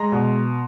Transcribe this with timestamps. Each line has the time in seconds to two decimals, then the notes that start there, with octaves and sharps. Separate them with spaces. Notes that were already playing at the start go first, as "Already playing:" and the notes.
Already playing: G#3 A#5 C6
0.12 B2